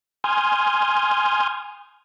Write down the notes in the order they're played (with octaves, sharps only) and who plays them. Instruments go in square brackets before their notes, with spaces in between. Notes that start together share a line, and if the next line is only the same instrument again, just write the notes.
[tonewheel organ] G#5 C6 D#6 F6 G6 G#6